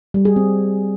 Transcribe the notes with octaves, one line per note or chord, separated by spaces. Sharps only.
G3
G#4
C4